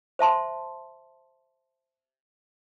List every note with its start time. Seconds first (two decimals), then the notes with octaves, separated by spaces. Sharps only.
0.19 C5 E5 A5 C6